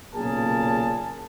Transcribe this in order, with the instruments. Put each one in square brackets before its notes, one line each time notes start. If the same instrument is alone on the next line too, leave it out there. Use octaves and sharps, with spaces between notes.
[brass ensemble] B1 A#2 C#3 G#4 A#4 A5